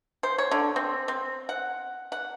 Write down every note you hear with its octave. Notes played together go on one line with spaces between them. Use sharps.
C5
C#5
D3
C4
C4
F#5
F#5